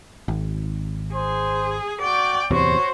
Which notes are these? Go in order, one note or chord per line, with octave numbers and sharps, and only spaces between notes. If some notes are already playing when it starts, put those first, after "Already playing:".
G#1
G#4 C5
F#4 D5 G5
D1 E2 C3 F#4 C5 C#5